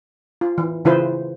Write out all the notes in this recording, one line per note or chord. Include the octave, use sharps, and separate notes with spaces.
F4
E3
C#3 E3 E4 F4 B4 C5